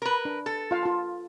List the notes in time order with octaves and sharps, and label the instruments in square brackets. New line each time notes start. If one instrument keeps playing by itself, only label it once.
[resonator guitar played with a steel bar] A#4 B4
[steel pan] D4
[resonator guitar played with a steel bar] A4
[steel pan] F4 F5
F4 A5